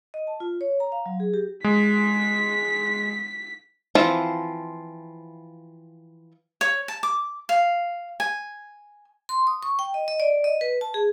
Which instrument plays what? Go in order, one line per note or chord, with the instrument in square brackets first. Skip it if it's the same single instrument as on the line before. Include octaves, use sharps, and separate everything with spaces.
[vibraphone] D#5
A5
F4
C#5
A#5
F5
F#3
G#4
G4
[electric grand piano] G#3 [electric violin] B6
[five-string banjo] E3 F3 C4 F4
[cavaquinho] C#5
A5
D6
F5
G#5
[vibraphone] C6
D#6
C#6
G5
D#5
D#5
D5
D#5
B4
A5
G#4